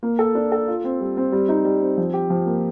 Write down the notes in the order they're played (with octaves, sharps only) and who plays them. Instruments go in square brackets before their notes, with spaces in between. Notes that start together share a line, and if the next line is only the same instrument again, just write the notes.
[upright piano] A#3
A4
D4
A4
F4
C4
G3
C4
G3
D#4
G3
C4
F3
G4
F3
A#3